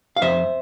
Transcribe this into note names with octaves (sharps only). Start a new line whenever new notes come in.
F5
F2 C5 E5